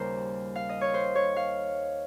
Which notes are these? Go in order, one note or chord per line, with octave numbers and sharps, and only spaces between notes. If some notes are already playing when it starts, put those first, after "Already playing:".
Already playing: D#2 C#3 G3 A#4 C5
F5
D#5
C#5
C5
C#5
F5